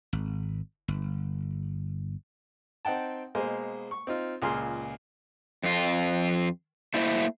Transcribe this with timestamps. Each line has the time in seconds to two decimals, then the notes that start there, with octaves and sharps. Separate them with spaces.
0.13 G#1
0.88 G1
2.85 C4 D#4 F#5 G5 A5
3.35 B2 G#3 A#3 C5 G#5
3.91 C#6
4.07 C4 D#4 F4
4.42 C#2 A#2 G#4 C6 F6
5.63 F2 F4
6.94 A3 A#3 E4 C5 C#5 E5